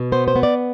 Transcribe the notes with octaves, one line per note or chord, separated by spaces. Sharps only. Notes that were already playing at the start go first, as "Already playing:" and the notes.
Already playing: B2
B3 C5
C5
B3
D5